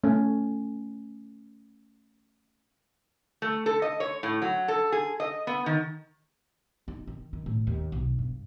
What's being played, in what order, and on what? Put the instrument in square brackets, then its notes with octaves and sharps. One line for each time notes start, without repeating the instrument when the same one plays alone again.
[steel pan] A3 C#4
[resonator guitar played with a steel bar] A3
A4
D#5
C#5
A2
F#3
A4
G#4
D#5
B3
D#3
[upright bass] D#4
D#3
D#3
A2
D#2
B1
G2